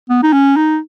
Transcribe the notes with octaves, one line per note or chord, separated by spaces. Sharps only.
B3
D#4
C#4
D#4